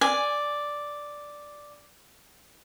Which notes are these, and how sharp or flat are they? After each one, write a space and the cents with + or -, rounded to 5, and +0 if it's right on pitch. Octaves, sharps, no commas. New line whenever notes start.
D5 +0 G#5 +0